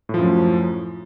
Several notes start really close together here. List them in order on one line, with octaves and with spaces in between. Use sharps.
A2 F3 F#2